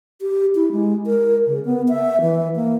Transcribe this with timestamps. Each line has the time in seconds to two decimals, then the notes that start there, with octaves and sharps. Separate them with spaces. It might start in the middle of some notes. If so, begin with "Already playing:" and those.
0.22 G4
0.55 E4
0.72 G#3
1.06 A#4
1.47 C#3
1.65 B3
1.89 E5
2.21 E3
2.56 A#3